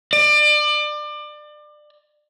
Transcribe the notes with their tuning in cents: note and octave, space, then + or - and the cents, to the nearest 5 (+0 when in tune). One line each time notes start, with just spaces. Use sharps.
D5 +30